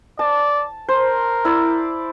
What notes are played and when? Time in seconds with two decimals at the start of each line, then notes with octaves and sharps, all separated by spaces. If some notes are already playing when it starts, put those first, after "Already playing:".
0.19 D5 A5
0.89 A#4 C5
1.45 E4 D5